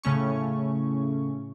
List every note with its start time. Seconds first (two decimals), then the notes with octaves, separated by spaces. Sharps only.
0.03 A2 C#3 A3 C#4 C#6